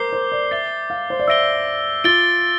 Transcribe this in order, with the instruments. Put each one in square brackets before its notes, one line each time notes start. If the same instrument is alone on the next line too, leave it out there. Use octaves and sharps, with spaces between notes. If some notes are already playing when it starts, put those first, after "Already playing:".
Already playing: [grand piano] A#4 C5 [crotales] D6 G6 C7 G7
[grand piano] C5
D5
[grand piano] E5 [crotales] A6 C7 G7
[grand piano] F5
C5
D5
[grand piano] E5 [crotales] E6 A#6 D7 G7
[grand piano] F4 [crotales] A6 D7 G7